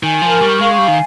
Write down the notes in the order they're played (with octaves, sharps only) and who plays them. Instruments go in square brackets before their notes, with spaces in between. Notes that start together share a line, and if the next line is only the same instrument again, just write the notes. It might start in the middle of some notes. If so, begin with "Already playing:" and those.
[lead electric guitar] D#3 [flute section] G#5
[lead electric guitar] F3 [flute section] A#4
[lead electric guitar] G3 [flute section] C#6
[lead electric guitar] G#3 [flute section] F5
[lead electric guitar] G3 [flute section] G#5
[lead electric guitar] D#3